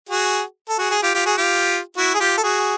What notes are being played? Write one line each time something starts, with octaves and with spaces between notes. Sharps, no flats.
F#4 G#4
A4
F#4 G#4
G#4
F4 G4
F4 G4
F#4 G#4
F4 G4
E4 F#4
G#4
F4 G4
A4
F#4 G#4